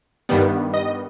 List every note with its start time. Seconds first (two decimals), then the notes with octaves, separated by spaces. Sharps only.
0.29 G2 D#3 G3 B3
0.74 D#5